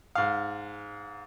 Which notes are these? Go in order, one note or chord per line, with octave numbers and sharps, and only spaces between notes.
G#2 F5